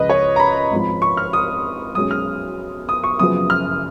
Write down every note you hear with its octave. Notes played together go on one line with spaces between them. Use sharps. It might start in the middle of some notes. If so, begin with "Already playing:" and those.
Already playing: C#2 C#3 F3 B4 D#5
C#5
A#5
B5
G#1 G#2 F3
C#6
F6
D#6
B1 B2 G#3 C#4 D#6
F6
D#6
C#6
F#1 F#2 C#3 F3 B3 D#6
F6